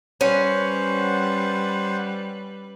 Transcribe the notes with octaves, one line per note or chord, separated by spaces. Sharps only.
G3 C#4 B4 C5 F#5